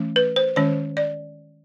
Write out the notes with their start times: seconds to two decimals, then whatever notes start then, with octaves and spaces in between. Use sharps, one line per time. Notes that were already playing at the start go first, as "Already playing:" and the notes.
Already playing: E3 A3 C#4
0.16 B4
0.36 C5
0.56 D#3 G#3 C#4 C#5
0.97 D5